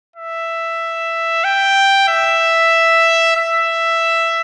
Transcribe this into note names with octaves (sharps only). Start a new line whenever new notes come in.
E5
G5
E5
E5